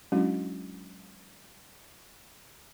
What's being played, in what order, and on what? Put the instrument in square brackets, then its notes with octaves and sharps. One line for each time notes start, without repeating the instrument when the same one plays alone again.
[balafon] F#3 G#3 C#4 D4 E4 F#4